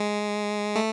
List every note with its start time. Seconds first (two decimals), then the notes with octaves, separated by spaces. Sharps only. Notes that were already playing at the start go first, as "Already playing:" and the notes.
Already playing: G#3
0.76 A3